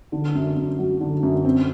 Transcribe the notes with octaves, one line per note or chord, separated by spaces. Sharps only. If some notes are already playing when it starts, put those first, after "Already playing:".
D3
F#2
F#2
F#3
D3
F#2
C4